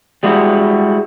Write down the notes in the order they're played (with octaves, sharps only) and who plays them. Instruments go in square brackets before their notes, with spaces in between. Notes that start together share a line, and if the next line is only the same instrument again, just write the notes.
[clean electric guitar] G3 G#3 E4 F#4